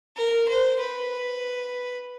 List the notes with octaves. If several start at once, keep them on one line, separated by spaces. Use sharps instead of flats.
A#4
C5
B4